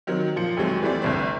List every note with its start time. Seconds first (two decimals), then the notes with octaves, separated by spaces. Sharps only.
0.07 D#3 F#3 C4
0.36 A#2 F3 C#7
0.57 D#2 F#3 G#3 A3 C4
0.82 E3 G3 A3 C4 D5
1.02 G1 C2 C4